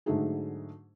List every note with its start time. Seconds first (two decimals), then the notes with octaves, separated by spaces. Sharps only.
0.06 G#2 D3 F#3 A3 D#4 G#4